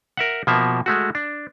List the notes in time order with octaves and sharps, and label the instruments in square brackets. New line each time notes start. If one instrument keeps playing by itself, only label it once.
[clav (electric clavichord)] A#4 E5 F#5
B2 F3 A#3 E5
G#3 A3 F#4
D4